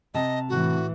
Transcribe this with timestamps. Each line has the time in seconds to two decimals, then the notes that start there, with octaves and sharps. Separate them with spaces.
0.14 C3 D#5 A5 A#5
0.49 A2 E3 F#4